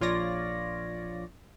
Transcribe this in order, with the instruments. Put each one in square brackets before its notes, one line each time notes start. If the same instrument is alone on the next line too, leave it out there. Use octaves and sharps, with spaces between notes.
[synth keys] A#1 F4 C#5 D5 A#6